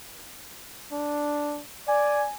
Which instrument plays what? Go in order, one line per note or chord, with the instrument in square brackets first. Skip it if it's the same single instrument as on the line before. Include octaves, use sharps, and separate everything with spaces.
[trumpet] D4
[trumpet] D5 [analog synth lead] G#5